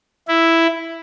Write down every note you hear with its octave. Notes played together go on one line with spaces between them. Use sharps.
E4